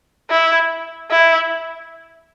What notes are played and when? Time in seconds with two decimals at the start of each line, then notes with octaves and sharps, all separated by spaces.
0.30 E4
1.11 E4